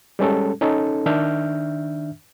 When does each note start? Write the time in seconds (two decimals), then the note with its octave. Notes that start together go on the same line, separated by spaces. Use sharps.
0.19 G3 G#3 C#4 A4
0.61 C#4 D#4 A4
1.06 D#3 D4 E5 F6 G6